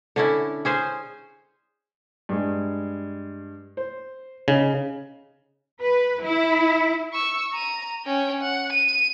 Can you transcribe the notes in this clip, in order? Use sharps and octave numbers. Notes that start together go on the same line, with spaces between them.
D3 C#4 E4
C#4 G#4 C5
G2 G#3
C5
C#3 D#4
B4
E4
C#6 E6
A#5 D#7
C#4 G5
F#5
D#7